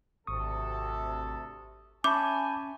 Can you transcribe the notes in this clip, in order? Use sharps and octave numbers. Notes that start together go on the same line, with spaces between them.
G#1 D2 C3 A4 C#6 D#6
C#4 E5 G#5 A5 B5 C#6 D6 G6